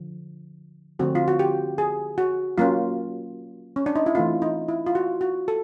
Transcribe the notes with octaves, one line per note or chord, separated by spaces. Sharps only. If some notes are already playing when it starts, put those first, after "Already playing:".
Already playing: D3 F3
D3 F3 A3 C4 F#4
F4
F#4
G4
G#4
F#4
F#3 A#3 C#4 F4
C#4
D4
D#4
E4
E3 A3 C4 F4
D#4
E4
F4
F#4
F#4
A4